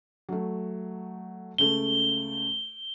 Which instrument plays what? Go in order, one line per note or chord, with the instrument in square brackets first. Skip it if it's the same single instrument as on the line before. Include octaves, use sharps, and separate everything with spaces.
[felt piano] F#3 A3
[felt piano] C#2 C#3 A3 [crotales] G7